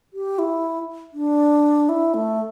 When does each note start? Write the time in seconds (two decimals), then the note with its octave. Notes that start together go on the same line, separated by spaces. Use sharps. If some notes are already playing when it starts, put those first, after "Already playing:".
0.13 G4
0.39 E4
1.13 D4
1.89 E4
2.14 A3